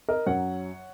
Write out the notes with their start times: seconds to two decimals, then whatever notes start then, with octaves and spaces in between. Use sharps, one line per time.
0.09 A#4 D#5
0.26 F#2 F#3 C#4 C#5 F#5